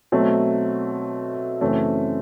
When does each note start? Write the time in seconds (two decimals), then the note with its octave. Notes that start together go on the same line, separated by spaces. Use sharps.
0.12 B2 F#3 A3 C4
1.61 F#2 C#3 E3 A3 C4